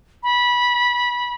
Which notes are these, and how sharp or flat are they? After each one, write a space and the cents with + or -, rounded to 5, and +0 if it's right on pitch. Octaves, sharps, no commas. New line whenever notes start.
B5 -20